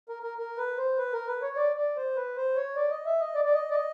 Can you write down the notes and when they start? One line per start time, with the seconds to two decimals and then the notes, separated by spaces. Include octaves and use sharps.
0.09 A#4
0.23 A#4
0.38 A#4
0.58 B4
0.78 C5
0.98 B4
1.13 A#4
1.27 B4
1.42 C#5
1.57 D5
1.76 D5
1.97 C5
2.16 B4
2.36 C5
2.56 C#5
2.75 D5
2.90 D#5
3.05 E5
3.20 D#5
3.35 D5
3.45 D5
3.54 D#5
3.71 D5
3.74 D#5